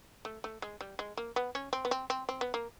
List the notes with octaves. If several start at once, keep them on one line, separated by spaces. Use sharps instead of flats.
A3
A3
G#3
G3
G#3
A#3
B3
C#4
C4
B3
C4
C4
C4
B3
A#3